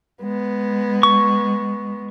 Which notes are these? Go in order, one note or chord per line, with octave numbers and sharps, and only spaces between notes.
G#3 B3
C#6